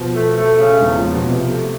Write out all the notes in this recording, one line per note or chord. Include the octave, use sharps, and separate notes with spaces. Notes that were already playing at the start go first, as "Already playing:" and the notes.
Already playing: B2 F3
A3
A3
C#3
E2 G#2
A#2
F3
B2
C3 F3
A3